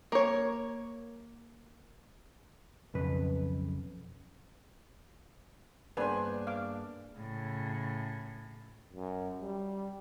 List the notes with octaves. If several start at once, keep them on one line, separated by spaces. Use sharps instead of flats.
A#3 C#5
B1 F2 C#3 B4
G2 A#3 B3 D4 G#4 B4 C5 G#5
F5 D6
A2 C#3
F#2
G3